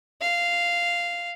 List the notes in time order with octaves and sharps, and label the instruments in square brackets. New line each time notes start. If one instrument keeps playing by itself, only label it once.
[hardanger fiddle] F5